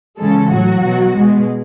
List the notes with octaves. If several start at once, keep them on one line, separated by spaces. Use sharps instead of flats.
C#3 E3 G#3 A4
A2 F#3 F#4
B2 F#3
B2 G#3